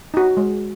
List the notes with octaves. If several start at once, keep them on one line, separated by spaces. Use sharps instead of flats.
D#4 F#4
G#3